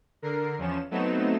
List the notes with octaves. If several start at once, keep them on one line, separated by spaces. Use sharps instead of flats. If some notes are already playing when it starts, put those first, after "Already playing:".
D3 A#4 C7
E2 F3 C#4 E7
F#3 A3 B3 C4 D#4 E7